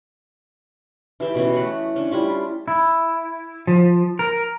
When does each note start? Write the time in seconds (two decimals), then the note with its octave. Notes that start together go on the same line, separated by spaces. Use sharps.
1.20 E3 G4 E5 G5
1.35 B2 E3 C#4
1.54 A3 F#5
1.96 C#4 D4
2.11 G3 E4 F4
2.68 E4
3.67 F3
4.19 A#4